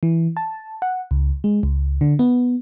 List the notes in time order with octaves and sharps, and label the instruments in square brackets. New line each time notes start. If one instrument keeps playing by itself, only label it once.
[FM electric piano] E3
A5
F#5
C#2
G#3
C#2
D3
B3